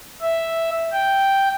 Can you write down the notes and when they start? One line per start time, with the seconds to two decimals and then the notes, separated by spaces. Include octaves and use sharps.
0.21 E5
0.92 G5